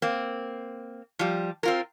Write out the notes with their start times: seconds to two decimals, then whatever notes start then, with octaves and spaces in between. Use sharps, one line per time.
0.02 A#3 C4
1.19 F3 G3
1.63 C4 F4 A#4